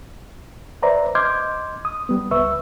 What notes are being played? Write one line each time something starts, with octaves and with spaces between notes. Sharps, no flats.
B4 C5 D5 E5 A#5
D#5 C6 D6 F6 G6 G#6
D#6
G3 B3
C#2 B4 E5 C#6 E6